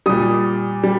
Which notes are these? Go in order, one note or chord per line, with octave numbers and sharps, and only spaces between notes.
A#2 G3 D#6
G3